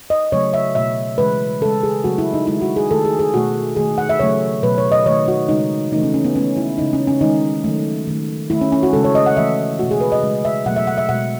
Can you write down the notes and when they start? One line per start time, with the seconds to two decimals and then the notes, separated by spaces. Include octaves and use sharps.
0.10 D#5
0.32 C#3 F#3 A3 C#5
0.54 E5
0.75 B2 A3 E5
1.18 C#3 E3 G#3 B4
1.61 C#3 A4
1.65 G#3
1.83 G#4
2.04 C#3 F#3 A3 F#4
2.18 E4
2.33 D#4
2.47 D#3 G#3 E4
2.62 F#4
2.76 G#4
2.91 D#3 A3 A4
3.05 G#4
3.19 G#4
3.34 B2 A3 F#4
3.76 D#3 A3 G#4
3.98 F#5
4.09 E5
4.19 C#3 F#3 A3 C#5
4.63 B2 F#3 A3 B4
4.78 C#5
4.92 D#5
5.06 D#3 C#5
5.09 A3
5.28 F#4
5.49 C#3 G#3 D#4
5.92 C#3 E3 A3 D#4
6.03 C#4
6.14 C#4
6.24 B3
6.36 D#3 A3 C#4
6.57 E4
6.78 G#3 D#4
6.81 C#3
6.93 C#4
7.07 C#4
7.21 D#3 G#3 D#4
7.64 D#3 F#3 A3
8.07 D#3 A3
8.50 D#3 A3 E4
8.61 C#4
8.72 C#4
8.83 F#4
8.93 G#3 A4
8.96 C#3
9.04 C#5
9.15 D#5
9.26 F#5
9.37 C#3 E3 A3 E5
9.79 B2 A3 F#4
9.91 G#4
10.01 B4
10.12 D#5
10.23 C#3 G#3
10.45 E5
10.66 B2 F#3 A3 F#5
10.76 E5
10.87 F#5
10.98 E5
11.09 B2 G#3 F#5